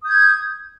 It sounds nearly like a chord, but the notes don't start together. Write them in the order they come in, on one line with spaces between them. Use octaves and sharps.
D#6 G6 G#6